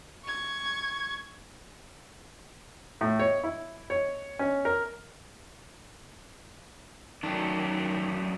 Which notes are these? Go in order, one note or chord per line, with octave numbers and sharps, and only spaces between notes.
C#6 G#6
A2
C#5
E4
C#5
C#4
A#4
F#2 D#3 A3 D4